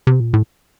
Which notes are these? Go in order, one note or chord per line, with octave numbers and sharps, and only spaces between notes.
C3
A#2
A2